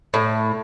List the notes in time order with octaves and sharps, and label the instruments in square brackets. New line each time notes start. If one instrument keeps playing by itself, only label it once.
[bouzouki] A2